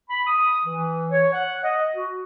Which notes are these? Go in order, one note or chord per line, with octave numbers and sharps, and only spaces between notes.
B5
D#6
E3
C#5
F#5
D#5
F#4